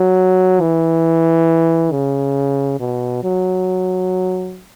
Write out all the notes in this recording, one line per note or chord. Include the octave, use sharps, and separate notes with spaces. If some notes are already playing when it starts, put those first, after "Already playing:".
Already playing: F#3
E3
C#3
B2
F#3